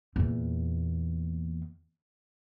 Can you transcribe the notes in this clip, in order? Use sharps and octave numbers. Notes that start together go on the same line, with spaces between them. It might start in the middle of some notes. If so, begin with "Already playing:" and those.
E2 A#2